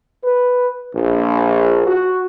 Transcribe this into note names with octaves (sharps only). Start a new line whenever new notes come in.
B4
A#1
F#4